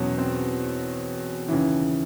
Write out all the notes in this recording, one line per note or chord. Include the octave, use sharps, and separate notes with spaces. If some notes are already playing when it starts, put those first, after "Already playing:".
Already playing: E2 B2 F#3 C#4
C4
D#2 C#3 E3